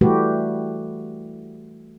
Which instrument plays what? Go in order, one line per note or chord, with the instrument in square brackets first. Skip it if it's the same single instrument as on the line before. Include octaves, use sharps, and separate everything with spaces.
[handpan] E3 G3 A3 F#4 G4 B4